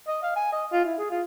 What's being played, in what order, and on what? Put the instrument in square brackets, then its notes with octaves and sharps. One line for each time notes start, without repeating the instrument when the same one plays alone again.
[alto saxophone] D#5
F5
G#5
D#5
F4
E4
G#4
F4